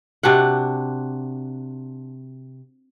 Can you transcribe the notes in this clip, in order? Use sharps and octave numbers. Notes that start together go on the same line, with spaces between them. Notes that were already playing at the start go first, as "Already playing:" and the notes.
C3 D4 F#4 F#5